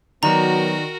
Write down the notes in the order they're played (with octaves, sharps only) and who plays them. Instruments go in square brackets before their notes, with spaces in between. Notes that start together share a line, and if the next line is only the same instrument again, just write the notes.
[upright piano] D#3 D5 [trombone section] F#3 B3 [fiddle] F#4 A#4 [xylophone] A#5